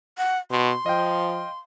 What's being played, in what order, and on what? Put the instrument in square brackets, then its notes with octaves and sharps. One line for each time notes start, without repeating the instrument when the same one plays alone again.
[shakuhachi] F#5
[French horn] B2 [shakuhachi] C6
[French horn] F3 [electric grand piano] D#5 F5 G5